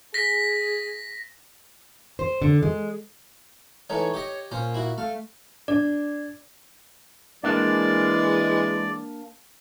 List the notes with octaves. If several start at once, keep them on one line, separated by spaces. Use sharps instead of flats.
G#4 A#6 B6
C5
D3
G#3
E3 A3 D#4 C#5
G4 D#5
A#2 C#4 C5
E4 F#4
A3 F5
D4 D5
E3 G#3 A#3 D4 D5